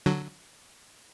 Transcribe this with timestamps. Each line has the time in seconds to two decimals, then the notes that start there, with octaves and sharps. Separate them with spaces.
0.06 D3 F#3